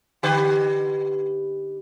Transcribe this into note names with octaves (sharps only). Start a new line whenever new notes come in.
D3 G4 B4